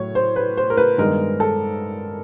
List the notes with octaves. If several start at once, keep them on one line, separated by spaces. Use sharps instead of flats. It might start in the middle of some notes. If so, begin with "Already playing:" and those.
Already playing: A2 F#3 C#5
C5
B4
C5
A#4
B4
G2 D#3 G#3 B3 A#4
A4